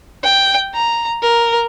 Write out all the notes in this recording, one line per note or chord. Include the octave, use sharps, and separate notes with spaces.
G5
A#5
A#4